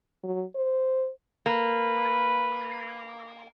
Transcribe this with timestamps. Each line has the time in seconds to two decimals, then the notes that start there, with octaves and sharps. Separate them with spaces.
0.24 F#3
0.55 C5
1.46 A#3 B4